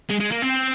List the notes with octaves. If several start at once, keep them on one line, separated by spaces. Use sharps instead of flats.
G#3
G#3
A#3
C4